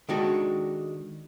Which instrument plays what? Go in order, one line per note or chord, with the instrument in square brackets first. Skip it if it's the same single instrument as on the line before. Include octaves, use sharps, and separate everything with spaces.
[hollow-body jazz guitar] D#3 G#3 D4 F#4 A4